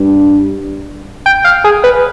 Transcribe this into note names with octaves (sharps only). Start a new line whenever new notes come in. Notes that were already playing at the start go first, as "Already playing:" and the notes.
Already playing: G2
G5
F5
G#4
B4